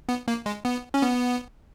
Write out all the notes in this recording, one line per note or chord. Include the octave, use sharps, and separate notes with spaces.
B3
A#3
G#3
B3
C#4
B3